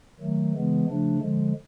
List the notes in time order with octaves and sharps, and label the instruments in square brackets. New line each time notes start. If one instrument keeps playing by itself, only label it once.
[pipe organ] D#3 F#3 A3
C#3 E3 G#3 B3
C#3 F3 A3 D4
D3 F3 G#3